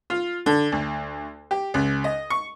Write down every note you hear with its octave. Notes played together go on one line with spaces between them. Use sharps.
F4
D3
D2
G4
C#2
D#5
C#6